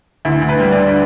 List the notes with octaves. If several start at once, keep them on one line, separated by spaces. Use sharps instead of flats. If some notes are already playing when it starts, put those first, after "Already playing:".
D2 E4
D2
B4
G3
D5
D3